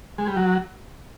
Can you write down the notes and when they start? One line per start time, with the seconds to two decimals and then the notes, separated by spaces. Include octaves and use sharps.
0.18 G#3
0.27 G3
0.37 F#3